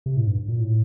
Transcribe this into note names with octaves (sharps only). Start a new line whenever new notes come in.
C3
A2
G2
A#2
A2